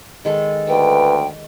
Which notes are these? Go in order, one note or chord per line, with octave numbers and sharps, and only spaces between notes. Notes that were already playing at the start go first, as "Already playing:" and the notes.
D#3 G#3 A4
D2 B4 G5